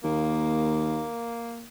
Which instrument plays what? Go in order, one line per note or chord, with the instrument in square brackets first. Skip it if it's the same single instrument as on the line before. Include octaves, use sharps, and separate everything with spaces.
[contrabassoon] D#2 [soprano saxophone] A#3